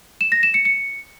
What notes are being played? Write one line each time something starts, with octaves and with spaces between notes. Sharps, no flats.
E7
A#6
E7
C#7
C#7